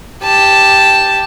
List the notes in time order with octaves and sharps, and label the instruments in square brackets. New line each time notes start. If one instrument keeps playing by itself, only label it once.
[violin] G4 A5